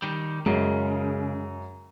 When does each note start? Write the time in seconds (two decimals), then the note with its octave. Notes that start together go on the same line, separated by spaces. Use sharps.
0.02 D#3 G3
0.46 F#2 C#3 G#3